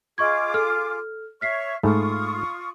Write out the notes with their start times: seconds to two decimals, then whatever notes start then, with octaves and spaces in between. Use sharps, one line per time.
0.18 F4 G#4 D#5 C#6 D6 G#6
0.54 A4 F6
1.41 C#5 E5 C#6 F6 B6 C7
1.83 G#2 A3 F4 B5 C#6 D#6